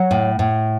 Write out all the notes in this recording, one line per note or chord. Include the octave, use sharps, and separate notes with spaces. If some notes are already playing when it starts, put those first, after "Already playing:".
Already playing: F#3 F#5
A2
A2